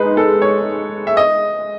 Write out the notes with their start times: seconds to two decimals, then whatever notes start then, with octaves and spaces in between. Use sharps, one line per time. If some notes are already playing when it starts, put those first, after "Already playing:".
Already playing: G#3 D#4 G#4 B4
0.17 A4
0.42 C#5
1.07 E5
1.17 D#5